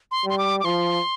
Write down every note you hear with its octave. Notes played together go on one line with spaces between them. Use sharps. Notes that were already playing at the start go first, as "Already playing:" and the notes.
C6
G3 C6
D6
D6
F3 C6